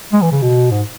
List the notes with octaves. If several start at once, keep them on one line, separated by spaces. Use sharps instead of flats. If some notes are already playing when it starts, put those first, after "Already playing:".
G#3
E3
C#3
B2
G#2